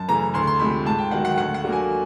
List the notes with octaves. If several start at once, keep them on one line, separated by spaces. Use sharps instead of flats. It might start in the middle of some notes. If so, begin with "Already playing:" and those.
Already playing: F#2 A5
C#3 E3 A3 A#5
D2 C6
C6
C3 F3 G#3 B5
G#2 A5
G5
D#3 F#3 F#5
F#5
D2 F#5
F#5
D3 F#3 A#3
G#5